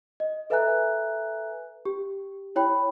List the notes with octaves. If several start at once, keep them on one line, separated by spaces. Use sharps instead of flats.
D#5
A4 B4 E5 G#5 A#5 F#6
G4
E4 C#5 G5 B5